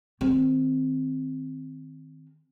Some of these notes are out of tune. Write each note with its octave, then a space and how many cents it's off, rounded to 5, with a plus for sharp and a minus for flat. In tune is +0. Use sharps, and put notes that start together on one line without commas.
D#3 +0 C4 +0